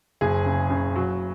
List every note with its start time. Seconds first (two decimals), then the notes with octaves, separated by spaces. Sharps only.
0.21 F#1 G#4
0.46 C#3
0.70 C#3
0.95 F#3